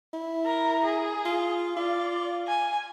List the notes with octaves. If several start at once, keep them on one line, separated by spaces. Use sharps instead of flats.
E4
A#4
G#4
F4
F4 D5
G#5